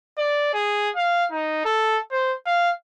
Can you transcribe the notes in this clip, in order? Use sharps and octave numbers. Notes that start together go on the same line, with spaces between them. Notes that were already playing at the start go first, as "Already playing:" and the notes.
D5
G#4
F5
D#4
A4
C5
F5